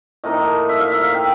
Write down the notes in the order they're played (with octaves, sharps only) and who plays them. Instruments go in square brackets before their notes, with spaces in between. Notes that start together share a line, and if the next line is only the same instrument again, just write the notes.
[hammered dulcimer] A2 F3 A#3 D#4 D#5
E5
F5
E5
F5
G5